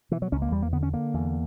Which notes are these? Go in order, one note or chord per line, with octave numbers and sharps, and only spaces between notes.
B2 E3
F#3
C#2 C#4
A#3
E2 G3
A#3
D3 B3
C#4
D3 A#3
E2